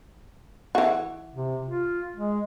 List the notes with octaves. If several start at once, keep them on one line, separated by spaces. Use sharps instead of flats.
E3 F#4
C3
F4
G#3